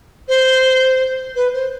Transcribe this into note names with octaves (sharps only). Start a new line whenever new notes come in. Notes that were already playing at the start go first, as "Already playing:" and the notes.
C5
B4
C5